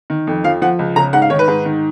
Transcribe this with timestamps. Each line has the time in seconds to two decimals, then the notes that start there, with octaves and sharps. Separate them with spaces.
0.10 D#3
0.27 F2
0.44 F3 F5
0.62 F3 F#5
0.79 C#2
0.96 C#3 A#5
1.13 G#2 F#5
1.22 F5
1.30 D#3 C#5
1.39 B4
1.48 G#2
1.65 D#3